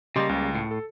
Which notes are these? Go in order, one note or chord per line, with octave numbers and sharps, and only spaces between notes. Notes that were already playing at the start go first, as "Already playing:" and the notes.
C#3 G3 A#3 G4 D#5 C6
C#2
A2
A4